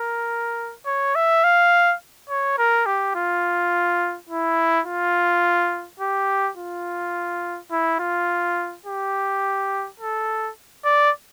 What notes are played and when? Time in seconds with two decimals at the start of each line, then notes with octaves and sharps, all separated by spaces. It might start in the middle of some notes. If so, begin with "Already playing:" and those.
Already playing: A#4
0.86 C#5
1.15 E5
1.44 F5
2.29 C#5
2.58 A#4
2.86 G4
3.15 F4
4.29 E4
4.86 F4
6.00 G4
6.57 F4
7.71 E4
7.99 F4
8.86 G4
10.00 A4
10.85 D5